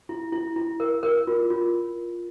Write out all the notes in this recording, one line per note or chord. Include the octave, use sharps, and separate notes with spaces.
E4
E4
E4
A#4
A#4
F4
F4